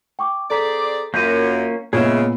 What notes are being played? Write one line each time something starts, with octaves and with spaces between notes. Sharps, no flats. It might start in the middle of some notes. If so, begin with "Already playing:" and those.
G5 C#6 D6
C4 G#4 A4 D5 A#5 B6
F#2 A#3 C#4 F4 G6 A#6 D#7
A#2 C#3 G#3 B3 G#4 C#5 E5